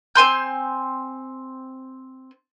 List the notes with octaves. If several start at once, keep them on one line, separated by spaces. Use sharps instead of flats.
C4 G#5 C6 G6